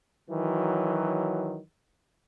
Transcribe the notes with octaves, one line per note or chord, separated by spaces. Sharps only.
D#3 E3 F#3